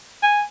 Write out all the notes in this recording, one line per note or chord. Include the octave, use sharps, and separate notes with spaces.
G#5